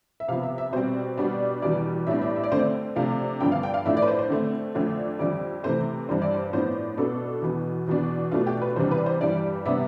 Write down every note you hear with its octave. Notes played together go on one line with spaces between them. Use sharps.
E5
C3 F3 B3 F5
E5
E5
B2 G3 C4 C5
B2 G3 B3 D4
E2 B2 G3 D5
A2 G3 B3 D4 E5
E5
E5
D5
D3 A3 C4 C5
D5
C3 F3 A3 D4 F5
G2 D3 F3 B3 D4 G5
F5
G5
F5
A2 F3 A3 D4 E5
D5
B4
C5
C5
D3 A3 C4
F2 D3 A3 D4
F2 D3 G3 D5
C3 E3 A3 C4 C5
G2 E3 G3 D4 C5
D5
C5
A2 F3 B3 D4 C5
B2 B3 D4 A4
E2 B2 B3
E2 B2 B3 D4
B2 A3 D4 F4
G4
B4
E2 C3 G3 D4 C5
B4
C5
G2 E3 G3 D5
C3 G3 B3 D4 E5